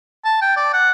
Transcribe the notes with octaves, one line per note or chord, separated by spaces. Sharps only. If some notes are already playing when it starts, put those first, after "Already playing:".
A5
G5
D5
F#5